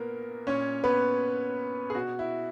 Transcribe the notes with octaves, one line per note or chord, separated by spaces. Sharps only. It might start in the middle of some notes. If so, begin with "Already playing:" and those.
Already playing: A#2 A#3 B3 A#4
A#2 C#4 C#5
B3 B4
G#4
B2 F#4
E4